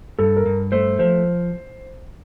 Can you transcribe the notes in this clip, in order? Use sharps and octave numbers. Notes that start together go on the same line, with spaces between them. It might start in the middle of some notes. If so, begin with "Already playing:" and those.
G2 A4
A#4
G2
A3 C5
F3 C5